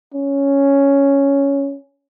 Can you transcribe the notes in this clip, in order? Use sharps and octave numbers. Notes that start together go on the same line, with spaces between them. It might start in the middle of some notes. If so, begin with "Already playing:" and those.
C#4